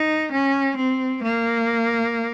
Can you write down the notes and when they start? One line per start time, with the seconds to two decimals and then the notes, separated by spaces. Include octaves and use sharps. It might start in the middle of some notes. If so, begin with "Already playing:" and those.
Already playing: D#4
0.32 C#4
0.76 C4
1.23 A#3